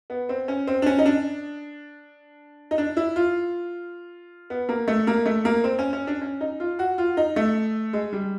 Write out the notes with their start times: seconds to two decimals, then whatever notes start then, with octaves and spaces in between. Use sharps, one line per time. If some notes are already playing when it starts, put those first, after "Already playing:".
0.10 B3
0.29 C4
0.48 C#4
0.67 C4
0.82 D4
0.86 C#4
0.98 D#4
1.06 D4
2.71 D#4
2.78 D4
2.97 E4
3.16 F4
4.50 B3
4.69 A#3
4.88 A3
5.07 A#3
5.26 A3
5.45 A#3
5.64 C4
5.79 C#4
5.93 C#4
6.07 D4
6.22 C#4
6.41 D#4
6.60 F4
6.79 F#4
6.98 F4
7.17 D#4
7.36 A3
7.93 G#3
8.13 G3